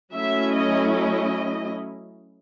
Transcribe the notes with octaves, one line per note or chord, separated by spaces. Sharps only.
F#3 A3 C#4 E4 E5
D#5
D#5